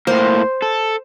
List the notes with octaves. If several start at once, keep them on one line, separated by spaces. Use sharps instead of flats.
A2 A#3 C5
A4